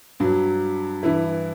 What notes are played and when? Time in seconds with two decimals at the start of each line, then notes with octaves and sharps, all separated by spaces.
0.20 G2 F#3
1.03 G2 E3 E4